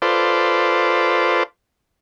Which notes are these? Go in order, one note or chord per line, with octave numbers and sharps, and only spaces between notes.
F4 A4 B4 C5 D5